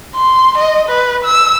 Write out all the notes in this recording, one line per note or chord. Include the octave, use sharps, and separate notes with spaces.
C6
D#5
B4
E6